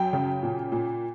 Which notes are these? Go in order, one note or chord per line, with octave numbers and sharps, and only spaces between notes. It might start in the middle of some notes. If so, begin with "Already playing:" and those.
Already playing: F#2 F#3 G5
C#3
A#2
A#2